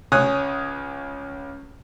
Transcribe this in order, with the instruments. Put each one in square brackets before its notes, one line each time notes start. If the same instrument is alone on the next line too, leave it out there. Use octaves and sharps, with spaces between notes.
[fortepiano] C#2 C#5 G#5 D#6 F#6